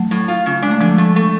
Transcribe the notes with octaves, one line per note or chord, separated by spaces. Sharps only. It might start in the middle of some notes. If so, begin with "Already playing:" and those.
Already playing: F#3 A3
A2
F4
C#3
G#3 D4
A3
D3 F3 G#3
A3
A3